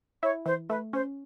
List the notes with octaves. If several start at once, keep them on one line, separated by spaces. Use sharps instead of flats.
E4 C#5
E3 C5
A3 B4
C#4 C5